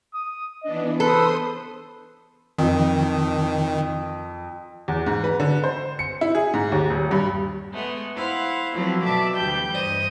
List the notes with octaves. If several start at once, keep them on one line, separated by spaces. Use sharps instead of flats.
D#6
E3 B3 D4 D#5
A4 B4 C5 C6 D#6
F2 D#3
E2
G#2
B4
D3
C5
C#7
E4
G#4
G#2
D#2
D#1
G2
G#3 A3 B3
E4 C5 F5 F#5
F3 F#3 A3 B3 C4 E4
B2 D5 E5 A5 D6
D2 E3 G3 G5 G6
G2 C5 D#5